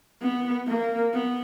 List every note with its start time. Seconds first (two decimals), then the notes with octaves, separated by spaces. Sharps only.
0.21 B3
0.67 A#3
1.14 B3